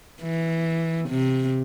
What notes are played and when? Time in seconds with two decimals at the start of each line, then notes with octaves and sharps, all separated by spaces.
0.22 E3
1.09 C3